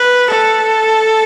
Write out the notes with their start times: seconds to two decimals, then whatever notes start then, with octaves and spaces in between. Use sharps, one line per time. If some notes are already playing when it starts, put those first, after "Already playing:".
Already playing: B4
0.31 A4